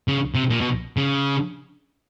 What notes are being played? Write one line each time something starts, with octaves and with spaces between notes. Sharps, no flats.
C#3
C3
A#2
B2
C#3